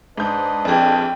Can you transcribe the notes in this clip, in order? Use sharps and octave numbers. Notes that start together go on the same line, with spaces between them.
G#2 D4 B4 D#5 G6
A#1 F2 C4 G#4 G5